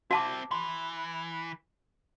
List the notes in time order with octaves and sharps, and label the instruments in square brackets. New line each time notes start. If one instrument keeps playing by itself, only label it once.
[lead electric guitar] C4 E4 [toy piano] F#4 A5 D6
[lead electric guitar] E3 [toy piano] C6